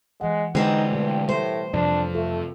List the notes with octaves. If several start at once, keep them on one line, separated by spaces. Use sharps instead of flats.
E3 G#3 F#5
D3 E3 G3 G#3 C4 D#4 G4 F#5
G2 B2 A3 G4
A2 G3 B4 C5
F2 C3 D4
A3 F4 A4